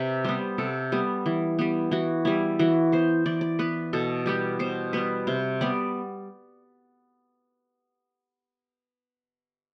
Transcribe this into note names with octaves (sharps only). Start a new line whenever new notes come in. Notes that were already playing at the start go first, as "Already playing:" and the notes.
Already playing: C3 B4
G3 B3 C5
C3 A4
G3 B3
E3
G3 B3
E3 F#4
G3 B3 E4
E3 F#4
B3 C5
E3 D5
D5
B3 B4
B2 A4
G3 B3 G4
B2 C5
G3 B3 B4
C3 C5
G3 B3 D5